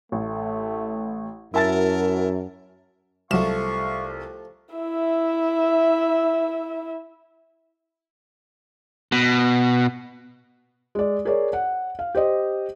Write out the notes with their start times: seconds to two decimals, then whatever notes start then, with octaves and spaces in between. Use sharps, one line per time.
0.12 A1 A3
1.54 F#2 E4 F#4 A#4 A5 A6
3.31 C2 F3 F#3 A3 F4 F5 C#6 E7
4.75 E4 E5
9.12 B2
10.95 G#3 D5
11.25 G#4 A#4 C#5 D5
11.53 F#5
11.99 F5
12.15 G4 C5 D#5